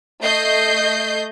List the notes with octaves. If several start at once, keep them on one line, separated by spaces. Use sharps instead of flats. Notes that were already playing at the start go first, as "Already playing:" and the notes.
A3 D#5 G6 C7